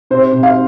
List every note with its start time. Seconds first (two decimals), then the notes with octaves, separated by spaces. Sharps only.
0.10 C3 C5
0.32 C3
0.43 F5